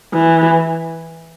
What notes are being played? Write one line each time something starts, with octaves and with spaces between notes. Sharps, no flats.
E3